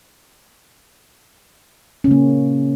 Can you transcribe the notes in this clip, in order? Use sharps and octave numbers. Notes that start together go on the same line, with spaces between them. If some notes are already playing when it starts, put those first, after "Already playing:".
C#3 A#3 C#4